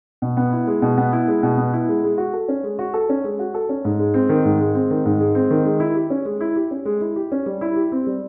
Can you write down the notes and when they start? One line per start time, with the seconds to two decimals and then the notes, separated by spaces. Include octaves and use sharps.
0.22 B2
0.37 B3
0.52 E4
0.67 G#3
0.82 B2
0.98 B3
1.13 E4
1.28 G#3
1.43 B2
1.58 B3
1.73 E4
1.89 G#3
2.03 G#3
2.18 F#4
2.33 A4
2.48 C#4
2.63 G#3
2.79 F#4
2.94 A4
3.09 C#4
3.24 G#3
3.39 F#4
3.54 A4
3.69 C#4
3.85 G#2
3.99 G#3
4.14 C4
4.29 D#3
4.45 G#2
4.60 G#3
4.75 C4
4.90 D#3
5.05 G#2
5.20 G#3
5.35 C4
5.51 D#3
5.65 G#3
5.80 E4
5.95 G4
6.10 C#4
6.25 G#3
6.41 E4
6.56 G4
6.71 C#4
6.85 G#3
7.01 E4
7.16 G4
7.32 C#4
7.46 G3
7.61 E4
7.76 G4
7.92 C4
8.07 G3